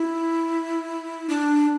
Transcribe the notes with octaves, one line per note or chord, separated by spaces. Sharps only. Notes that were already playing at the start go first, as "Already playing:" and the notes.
Already playing: E4
D4